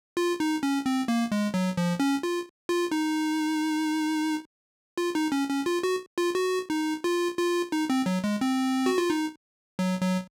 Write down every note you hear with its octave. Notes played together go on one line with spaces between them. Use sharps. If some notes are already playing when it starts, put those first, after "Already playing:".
F4
D#4
C#4
C4
A#3
G#3
F#3
F3
C#4
F4
F4
D#4
F4
D#4
C#4
C#4
F4
F#4
F4
F#4
D#4
F4
F4
D#4
C4
F#3
G#3
C4
F#4
F4
D#4
F#3
F#3